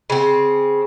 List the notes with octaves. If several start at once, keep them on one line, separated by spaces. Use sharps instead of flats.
C#3 C4